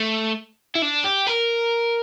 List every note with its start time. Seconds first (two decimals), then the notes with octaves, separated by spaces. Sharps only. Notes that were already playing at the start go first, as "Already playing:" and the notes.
Already playing: A3
0.76 E4
0.82 D4
1.05 G4
1.27 A#4